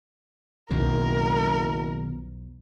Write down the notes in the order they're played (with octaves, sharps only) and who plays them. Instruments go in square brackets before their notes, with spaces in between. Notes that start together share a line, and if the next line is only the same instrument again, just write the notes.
[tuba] F#1 [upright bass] B1 E2 [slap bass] B2 D#3 F3 [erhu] A#4